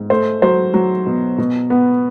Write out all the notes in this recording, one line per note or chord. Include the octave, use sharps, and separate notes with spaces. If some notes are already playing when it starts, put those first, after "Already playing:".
Already playing: G#2
A3 C5
F#3 C5
F#3
B2
B2
B3